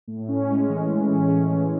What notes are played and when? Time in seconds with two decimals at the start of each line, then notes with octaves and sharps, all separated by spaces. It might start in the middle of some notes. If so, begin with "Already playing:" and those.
0.08 A2
0.28 C#4
0.49 G#3
0.69 E3
0.89 A2
1.11 C#4
1.31 G#3
1.52 E3